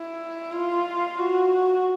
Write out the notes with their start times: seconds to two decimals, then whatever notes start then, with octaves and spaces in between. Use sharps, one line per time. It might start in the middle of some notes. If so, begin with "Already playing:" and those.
Already playing: E4
0.52 F4
1.18 F#4